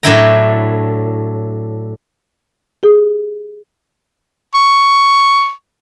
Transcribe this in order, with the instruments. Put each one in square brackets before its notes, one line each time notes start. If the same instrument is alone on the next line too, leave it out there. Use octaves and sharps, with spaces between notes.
[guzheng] A2 F#3 D4 E4 G5 A#5
[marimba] G4 G#4
[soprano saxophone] C#6